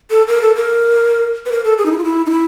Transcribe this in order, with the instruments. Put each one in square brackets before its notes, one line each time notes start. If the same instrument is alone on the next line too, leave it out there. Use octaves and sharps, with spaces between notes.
[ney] A4
A#4
A4
A#4
B4
A#4
A4
G#4
D#4
E4
F4
E4
D#4
E4